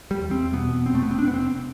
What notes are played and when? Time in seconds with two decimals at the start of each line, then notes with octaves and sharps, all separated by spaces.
0.11 G3
0.21 E2
0.31 C4
0.53 B2 B3
0.85 F1 C4
0.95 A3
1.03 B3
1.11 C4
1.18 F1 D4
1.28 B3
1.34 C4